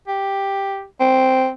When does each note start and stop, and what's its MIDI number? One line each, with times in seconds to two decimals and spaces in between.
0.08 0.84 67
1.00 1.50 60